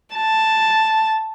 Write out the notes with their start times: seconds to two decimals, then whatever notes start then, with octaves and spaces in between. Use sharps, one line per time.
0.15 A5